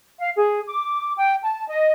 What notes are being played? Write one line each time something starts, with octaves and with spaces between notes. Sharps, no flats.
F5
G#4
D6
G5
A5
D#5